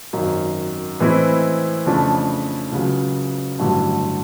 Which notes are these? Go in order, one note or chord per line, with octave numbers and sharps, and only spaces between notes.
G#1 F#2 D#3
A2 E3 G#3 C4 E4
F2 C#3 F3 A3 D4
C#2 C#3 F#3
A1 G2 D3 F#3 A3